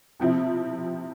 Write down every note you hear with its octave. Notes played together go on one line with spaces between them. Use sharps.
C3 F3 C4 E4